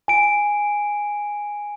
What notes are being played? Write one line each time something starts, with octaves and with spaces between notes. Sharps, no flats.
G#5 D7